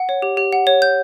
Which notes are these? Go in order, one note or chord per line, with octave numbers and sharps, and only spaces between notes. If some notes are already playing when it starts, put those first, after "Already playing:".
Already playing: F#5
C#5
G4
G4
F#5
C#5
G6